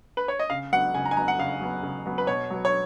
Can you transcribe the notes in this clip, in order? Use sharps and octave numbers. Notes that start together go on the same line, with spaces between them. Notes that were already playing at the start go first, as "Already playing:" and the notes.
B4
C#5
D#5
C#3 F5
F#3 B3 F#5
C#3 G#5
A#5
G#5
F#3 B3 A#5
F#5
C#3 F5
F#3 B3
C#3
F#3 B3
B4
B2 C#5
F#3 B3
C#5